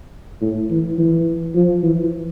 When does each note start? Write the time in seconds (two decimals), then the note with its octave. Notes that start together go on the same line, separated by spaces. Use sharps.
0.41 A2
0.70 E3
0.98 E3
1.55 F3
1.83 E3